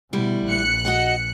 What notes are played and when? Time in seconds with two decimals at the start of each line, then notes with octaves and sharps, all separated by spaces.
0.13 D2 B2 G3 E4
0.47 A#1 F#6 C#7
0.85 F#4 D#5 F#5